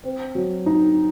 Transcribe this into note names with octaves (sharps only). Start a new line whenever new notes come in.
C4
F#3
D#4